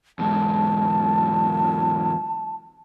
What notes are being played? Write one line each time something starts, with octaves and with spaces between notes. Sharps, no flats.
E2 G#2 A5